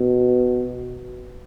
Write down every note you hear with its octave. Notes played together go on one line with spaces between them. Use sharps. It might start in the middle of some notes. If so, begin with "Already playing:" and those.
Already playing: B2